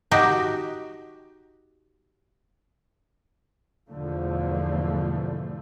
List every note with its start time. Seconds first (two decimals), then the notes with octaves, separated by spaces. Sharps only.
0.11 D#4 F#4 G4
3.88 E2 G#2 B2 D3 F3 A3